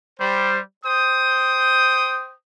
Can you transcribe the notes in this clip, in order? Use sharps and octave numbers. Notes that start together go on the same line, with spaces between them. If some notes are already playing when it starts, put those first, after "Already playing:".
G3 C5
C5 G5 D#6